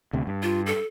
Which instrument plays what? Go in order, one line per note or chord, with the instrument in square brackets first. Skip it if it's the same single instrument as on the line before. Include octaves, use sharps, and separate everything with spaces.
[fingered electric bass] D2 C3
G2
[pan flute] F4
A4